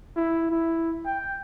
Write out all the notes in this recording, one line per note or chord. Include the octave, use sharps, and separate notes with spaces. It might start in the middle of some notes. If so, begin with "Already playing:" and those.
E4
E4
G5